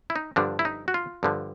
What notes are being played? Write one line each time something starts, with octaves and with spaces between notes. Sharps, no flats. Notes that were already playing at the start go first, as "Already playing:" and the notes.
E4
D#4
G2 D3 F3 D4
E4
D#4
F#4
F4
G2 D3 F3